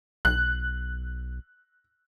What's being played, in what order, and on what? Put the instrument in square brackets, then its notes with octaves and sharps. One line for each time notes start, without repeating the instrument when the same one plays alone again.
[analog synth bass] B1 [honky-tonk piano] F#6